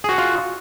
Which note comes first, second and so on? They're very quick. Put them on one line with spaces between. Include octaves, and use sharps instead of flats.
G#4 F#4 F#5 F4